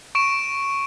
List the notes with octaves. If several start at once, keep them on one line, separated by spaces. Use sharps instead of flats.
C#6 D7 E7